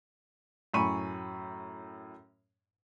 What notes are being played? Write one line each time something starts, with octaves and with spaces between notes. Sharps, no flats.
F#2 A2 G#5 B5 C#6 D#7